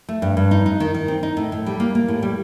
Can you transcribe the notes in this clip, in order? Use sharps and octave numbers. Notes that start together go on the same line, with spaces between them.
A3
G2
G2
D#4
D#4
D#3
D#3
C4
D#4
A2
A2
G3
A#3
A#3
A2
G3